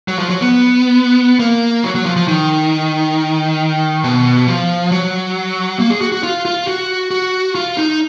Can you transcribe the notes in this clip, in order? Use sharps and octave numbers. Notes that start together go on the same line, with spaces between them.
F#3
F3
F#3
B3
A#3
F#3
F#3
F3
F3
D#3
B2
F3
F#3
A#3
G#4
F#4
F#4
F4
F4
F#4
F#4
F4
D#4